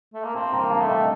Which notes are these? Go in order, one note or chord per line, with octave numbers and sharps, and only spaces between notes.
A3
A#3
C4 F5 A5
G5 A#5
A#3
F5 A5
A3
D#5 G5